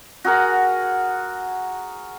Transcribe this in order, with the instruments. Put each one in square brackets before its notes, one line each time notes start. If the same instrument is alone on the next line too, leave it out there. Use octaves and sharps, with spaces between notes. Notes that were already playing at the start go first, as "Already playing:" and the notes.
[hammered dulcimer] F#4 G#4 A#4 F#5